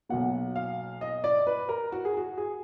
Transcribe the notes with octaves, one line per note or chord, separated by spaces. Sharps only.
B1 B2 F#3 A#3 F#5
F5
D#5
D5
B4
A#4
F#4
G#4
F#4
G#4